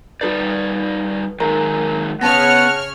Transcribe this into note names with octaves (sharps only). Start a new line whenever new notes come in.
G3 D#4 F#4 A4 B4 D5
D#3 F#3 G#3 A#4 A#5
C#3 B3 C#4 C#5 F#5 A5 F6 A#6